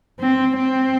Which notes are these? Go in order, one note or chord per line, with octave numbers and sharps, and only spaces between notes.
C4
C4